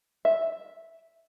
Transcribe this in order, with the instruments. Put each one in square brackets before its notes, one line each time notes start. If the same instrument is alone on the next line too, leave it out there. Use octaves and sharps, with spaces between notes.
[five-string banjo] E5